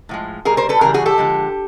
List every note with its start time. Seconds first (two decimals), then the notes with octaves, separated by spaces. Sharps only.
0.09 A2 F3 G#3
0.45 B2 G3 G#4 A#4
0.57 A#4 C5
0.69 A4 B4
0.81 C#3 E3 G3 G#4 A#4
0.94 F#4 G#4
1.06 G4 A4
1.18 D3 F3 G#3